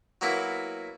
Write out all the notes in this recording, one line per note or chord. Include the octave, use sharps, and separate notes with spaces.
F#3 A#3 B3 E4